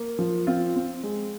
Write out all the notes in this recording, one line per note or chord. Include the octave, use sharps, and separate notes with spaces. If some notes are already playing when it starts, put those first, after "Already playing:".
Already playing: A#3
F3
C4 F4
C4
G#3